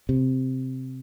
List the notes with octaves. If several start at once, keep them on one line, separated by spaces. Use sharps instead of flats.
C3